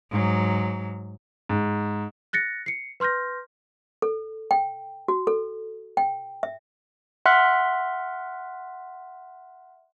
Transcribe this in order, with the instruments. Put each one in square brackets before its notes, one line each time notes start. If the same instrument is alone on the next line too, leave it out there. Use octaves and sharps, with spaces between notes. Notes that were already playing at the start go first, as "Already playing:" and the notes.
[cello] G#2 F#3
[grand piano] G#2
[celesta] F#6 A6 A#6 C#7
C7 C#7
B4 C6 F6 G6 A#6
[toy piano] A4
G5
F#4
A4
G5
E5
[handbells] E5 F#5 C6 F6 F#6 B6